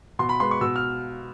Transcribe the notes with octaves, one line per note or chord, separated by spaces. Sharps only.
B2 C6
B5
G#3 B3 C6
C#6
B2 E6
F6